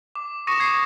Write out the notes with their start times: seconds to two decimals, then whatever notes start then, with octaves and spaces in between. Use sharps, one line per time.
0.15 D6
0.47 C#6 D#6 A#6 C#7 E7
0.60 G#6 C7